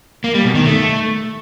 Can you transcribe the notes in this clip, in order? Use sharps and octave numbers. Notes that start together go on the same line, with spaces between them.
A#3
G3
B2
D#3
A3